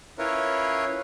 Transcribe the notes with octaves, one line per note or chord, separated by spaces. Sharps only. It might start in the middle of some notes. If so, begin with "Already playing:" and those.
C#4 E4 F4 A#4 B4 C#5